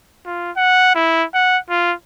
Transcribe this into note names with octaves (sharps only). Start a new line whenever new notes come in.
F4
F#5
E4
F#5
F4